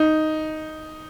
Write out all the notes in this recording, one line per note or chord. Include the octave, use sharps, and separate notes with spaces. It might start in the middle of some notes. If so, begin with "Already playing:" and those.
Already playing: D#4